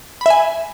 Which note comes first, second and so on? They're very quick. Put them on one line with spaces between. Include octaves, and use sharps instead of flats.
B5 E5 G#5